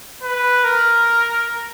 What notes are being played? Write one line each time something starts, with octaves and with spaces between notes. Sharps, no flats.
B4
A#4